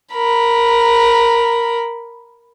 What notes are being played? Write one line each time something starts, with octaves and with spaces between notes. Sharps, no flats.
A#4 B5